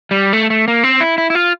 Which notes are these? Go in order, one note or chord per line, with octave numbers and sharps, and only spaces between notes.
G3
A3
A3
A#3
C4
E4
E4
E4
F4